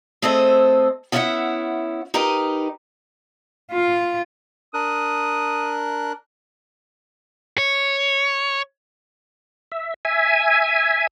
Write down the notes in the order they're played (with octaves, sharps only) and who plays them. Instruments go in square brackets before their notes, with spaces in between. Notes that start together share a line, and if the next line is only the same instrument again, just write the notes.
[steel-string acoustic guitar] A3 C4 G#4 A4 C5 D#5
B3 C#4 E4 D#5 E5 F#5
D#4 G4 A#4 B4 D#5
[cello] F4
[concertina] D4 A#4 F#6 [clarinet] D#6
[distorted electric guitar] C#5
[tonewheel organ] E5
E5 G#5